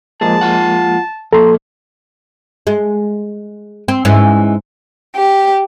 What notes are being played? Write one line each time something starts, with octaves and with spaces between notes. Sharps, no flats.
F3 G#3 A#3 G#4 A5
F4 F#5
F3 A#3 A4 A#5 C6
G#3
C4
G#2 E3 C#4
G4